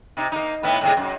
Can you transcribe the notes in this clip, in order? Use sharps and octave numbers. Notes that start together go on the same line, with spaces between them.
C3 D#4
A#3 D#4
A2 B3 E4
A2 C3 G#3
F#2